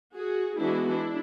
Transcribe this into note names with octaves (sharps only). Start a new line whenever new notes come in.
F#4 G#4
E3 G#3 B3 D4 E4 F#4
D4 E4